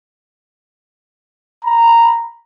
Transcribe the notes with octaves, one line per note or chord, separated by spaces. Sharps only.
A#5 B5